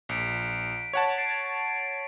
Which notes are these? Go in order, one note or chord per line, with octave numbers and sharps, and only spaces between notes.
A#1 B6 C#7 D7
C#5 F#5 A5
A6 C7 D7